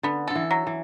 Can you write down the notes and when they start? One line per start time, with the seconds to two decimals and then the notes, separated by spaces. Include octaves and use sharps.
0.03 D3 B3
0.27 D3 A4
0.35 E3
0.51 F#3
0.67 E3